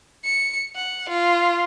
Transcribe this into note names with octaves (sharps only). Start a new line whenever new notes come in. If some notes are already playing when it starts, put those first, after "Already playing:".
C#7
F#5
F4